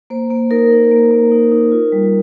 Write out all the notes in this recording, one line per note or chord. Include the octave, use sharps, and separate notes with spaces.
A#3 C5
A#3
D#4 A#4
D#4
A#3
A#3
D#4
D#4
F4
G3